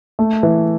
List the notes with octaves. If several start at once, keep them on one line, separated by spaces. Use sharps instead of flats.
A3
E3